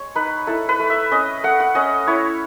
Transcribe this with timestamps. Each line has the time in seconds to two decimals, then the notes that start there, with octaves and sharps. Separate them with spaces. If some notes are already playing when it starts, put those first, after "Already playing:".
Already playing: G#3 C#5
0.15 D#4 B4
0.47 E4 A4
0.69 B4
0.79 A3
0.90 E5
1.11 C#4 D#5
1.44 A3 F#5
1.60 F#5
1.75 C#4 D#5
2.07 E4 C#5